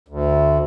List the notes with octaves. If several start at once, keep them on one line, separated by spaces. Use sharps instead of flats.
D2